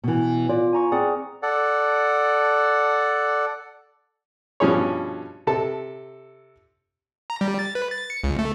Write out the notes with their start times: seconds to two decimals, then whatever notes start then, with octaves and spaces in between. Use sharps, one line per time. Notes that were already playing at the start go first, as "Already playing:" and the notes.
0.04 B2 E3
0.49 F4 D5
0.73 G#5 A#5 C#6
0.92 C4 G#4 D5 F#5
1.43 A4 D5 F#5
4.60 G2 B2 F3 C#4 G#4 C#5
5.47 C3 A4 A5
7.30 A#5
7.41 G3
7.59 A6
7.75 B4
7.91 A6
8.10 C#7
8.24 C#2
8.39 A3